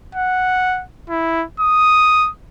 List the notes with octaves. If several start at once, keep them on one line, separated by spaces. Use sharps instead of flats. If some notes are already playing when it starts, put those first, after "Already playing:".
F#5
E4
D#6